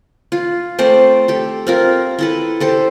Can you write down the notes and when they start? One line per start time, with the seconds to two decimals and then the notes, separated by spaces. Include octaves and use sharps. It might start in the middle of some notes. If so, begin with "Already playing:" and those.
0.32 F4
0.79 A3 C4 C5 D5
1.28 G4 A4
1.67 C4 F4 A#4
2.19 E4 A4 B4
2.60 G4 A4 C5